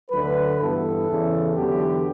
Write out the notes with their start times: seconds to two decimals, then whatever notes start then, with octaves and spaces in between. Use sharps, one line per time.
0.11 D2 D3 F#3 B4
0.59 G2 E3 B3 A4
1.07 E2 C#3 E3
1.55 E2 D3 F#3 B3 G4